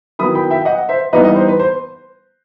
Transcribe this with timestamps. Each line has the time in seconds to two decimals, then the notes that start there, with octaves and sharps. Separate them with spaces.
0.19 D#3 F#3 B3 E4 B5 D#6
0.35 G5 B5
0.51 E5 G5
0.62 G5
0.65 D#5 F#5
0.89 C5 E5
1.13 E3 G3 B3 D#4 B4 D#5
1.25 B4 D#5
1.36 C5
1.48 B4
1.60 C5